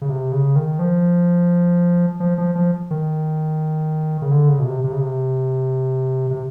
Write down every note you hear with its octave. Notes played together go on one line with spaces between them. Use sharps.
C#3
C3
C#3
D#3
F3
F3
F3
F3
D#3
C#3
D3
C#3
B2
C3
C3
C#3
C3
C3